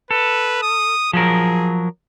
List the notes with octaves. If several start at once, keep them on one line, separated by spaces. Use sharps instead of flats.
A4 B4
D#6
F3 F#3 G#4 A#4